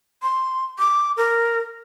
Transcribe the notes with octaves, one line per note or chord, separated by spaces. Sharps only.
C6
D6
A#4